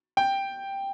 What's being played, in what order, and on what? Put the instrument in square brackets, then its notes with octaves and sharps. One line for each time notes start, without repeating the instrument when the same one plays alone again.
[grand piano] G5